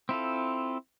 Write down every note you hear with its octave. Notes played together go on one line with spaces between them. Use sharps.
C4 E4 F4 A4